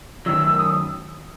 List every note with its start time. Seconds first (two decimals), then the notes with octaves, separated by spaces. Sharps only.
0.26 F#2 D#3 F#3 E6
0.46 E6
0.58 D#6